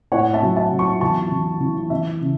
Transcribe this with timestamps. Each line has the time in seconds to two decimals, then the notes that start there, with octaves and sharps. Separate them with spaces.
0.12 A2 C#5 F#5
0.34 E5 A5
0.42 F#3
0.56 E5 A5
0.72 F#3
0.79 A5 C#6
1.01 E2 A5 C#6
1.31 E3
1.60 E3
1.90 E3 E5
2.21 C#3